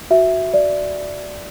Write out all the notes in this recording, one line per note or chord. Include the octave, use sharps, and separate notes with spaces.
F#4 E5
D5